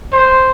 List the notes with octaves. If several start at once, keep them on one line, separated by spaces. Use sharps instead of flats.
C5